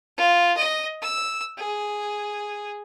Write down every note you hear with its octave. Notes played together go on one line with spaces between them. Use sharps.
F4
D#5
E6
G#4